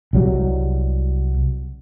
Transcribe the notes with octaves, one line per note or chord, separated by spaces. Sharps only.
C2 F#3 G3